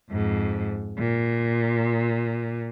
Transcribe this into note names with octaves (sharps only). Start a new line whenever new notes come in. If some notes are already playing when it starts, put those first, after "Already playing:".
F2 G#2
A#2